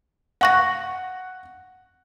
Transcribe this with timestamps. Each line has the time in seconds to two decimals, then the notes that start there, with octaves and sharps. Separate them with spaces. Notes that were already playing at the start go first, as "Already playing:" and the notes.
0.41 F5 F#5 C#6 F#6 A#6